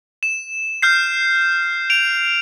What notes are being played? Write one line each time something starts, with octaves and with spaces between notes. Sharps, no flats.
E7
F6 G6 C7
D7 F7